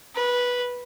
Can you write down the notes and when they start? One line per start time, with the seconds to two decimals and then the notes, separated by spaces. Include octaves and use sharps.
0.15 B4